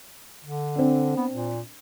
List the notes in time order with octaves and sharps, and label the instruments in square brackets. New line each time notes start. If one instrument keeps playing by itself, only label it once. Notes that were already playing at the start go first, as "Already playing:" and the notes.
[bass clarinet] D3
[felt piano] C4 D4
[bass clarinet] B3
A#2